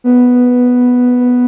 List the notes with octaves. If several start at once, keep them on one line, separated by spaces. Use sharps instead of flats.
B3